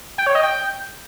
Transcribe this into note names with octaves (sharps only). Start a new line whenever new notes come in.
G5
C#5
D#5
G5